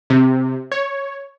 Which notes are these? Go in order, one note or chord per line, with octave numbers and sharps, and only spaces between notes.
C3
C#5